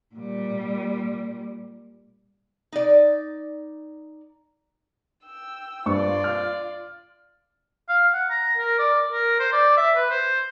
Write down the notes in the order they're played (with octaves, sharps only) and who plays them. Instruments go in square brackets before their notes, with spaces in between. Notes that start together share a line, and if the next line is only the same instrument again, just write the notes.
[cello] A#2 G3
[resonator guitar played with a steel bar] D#4 D5
[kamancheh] G5 E6
[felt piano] G2 C5 C#6 [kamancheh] F4 D5
[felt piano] F6
[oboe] F5
F#5
A#5
A#4
D5
A#4
C5
D5
E5
B4
C5